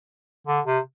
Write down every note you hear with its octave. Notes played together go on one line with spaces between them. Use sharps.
D3
C3